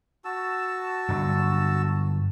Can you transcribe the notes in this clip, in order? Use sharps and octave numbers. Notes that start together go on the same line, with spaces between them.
F#4 A5 E6
G2 D3 F#3